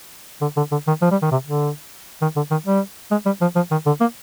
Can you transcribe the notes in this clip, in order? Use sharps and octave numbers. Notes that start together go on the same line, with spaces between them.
D3
D3
D3
D#3
F3
G3
D#3
C3
D3
D#3
D3
D#3
G3
G#3
G3
F3
F3
D#3
D3
A#3